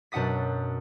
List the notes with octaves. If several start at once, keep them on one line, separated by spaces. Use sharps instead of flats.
F#2 B2 D4 F#5 D#6 B6